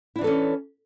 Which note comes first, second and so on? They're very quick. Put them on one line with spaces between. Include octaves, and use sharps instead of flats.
E4 D4 E3 A4 C#4